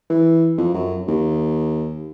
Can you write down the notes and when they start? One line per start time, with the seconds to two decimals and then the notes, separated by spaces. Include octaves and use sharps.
0.10 E3
0.58 F2
0.74 F#2
1.08 D#2